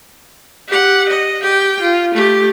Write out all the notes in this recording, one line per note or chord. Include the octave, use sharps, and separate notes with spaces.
G4 F#5
D#5
G4 G5
F4
A3 G4